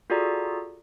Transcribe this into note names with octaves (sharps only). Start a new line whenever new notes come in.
F4 F#4 G#4 A4 D5 A#5